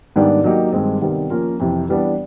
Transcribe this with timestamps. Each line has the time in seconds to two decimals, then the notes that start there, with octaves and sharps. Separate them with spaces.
0.16 G#2 D#3 G3 B3 D4
0.44 F#3 A#3 D#4 G4
0.72 G2 D#3 G#3 C4
1.01 C3 D#3 G3 B3
1.30 F3 A#3 C#4 F4 A#4
1.60 F2 C3 E3
1.89 E3 G3 B3 D4